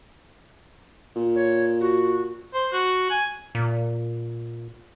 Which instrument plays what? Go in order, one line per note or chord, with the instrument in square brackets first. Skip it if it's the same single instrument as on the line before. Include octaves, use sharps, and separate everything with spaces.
[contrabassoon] A#2
[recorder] C#5
F#4
[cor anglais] C5
F#4
G#5
[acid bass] A#2